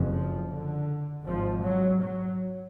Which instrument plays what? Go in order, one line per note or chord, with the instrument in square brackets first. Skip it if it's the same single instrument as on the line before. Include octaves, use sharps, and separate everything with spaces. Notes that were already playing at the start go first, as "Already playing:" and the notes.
Already playing: [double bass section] F#1 F2 C#3
F3
D3
G#1 G#2 F3
F#3
F#3